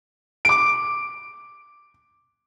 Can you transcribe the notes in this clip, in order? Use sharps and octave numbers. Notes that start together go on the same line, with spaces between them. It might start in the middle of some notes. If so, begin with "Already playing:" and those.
D6 D7